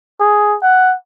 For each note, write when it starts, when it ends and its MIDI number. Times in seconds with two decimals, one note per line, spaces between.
0.20 0.56 68
0.62 0.95 78